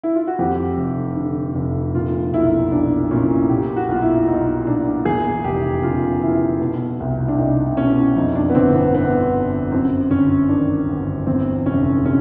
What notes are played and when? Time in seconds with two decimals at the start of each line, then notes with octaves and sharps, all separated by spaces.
0.03 E4
0.15 F4
0.27 F#4
0.39 F2 G4
0.78 F1
1.17 D3
1.55 F1
1.94 A#2 F4
2.33 B1 E4
2.72 B1 D4
3.11 A#2 C#4
3.50 A#2 G4
3.76 F#4
3.88 B1 F4
4.02 E4
4.27 B1 D#4
4.67 A#2 D4
5.05 E2 G#4
5.44 F1 G4
5.83 C#3 F4
6.22 E3 E4
6.60 B2
7.00 C2
7.28 D4
7.39 C2 D#4
7.77 B2 C#4
8.16 F2 D#4
8.36 D4
8.50 B3
8.55 G1 C4
8.74 B3
8.94 D3 B3
9.33 G1
9.71 F#2 C4
10.10 G1 C#4
10.49 D#3 D4
10.88 G1
11.27 E2 C4
11.66 F1 C#4
12.05 C3 C#4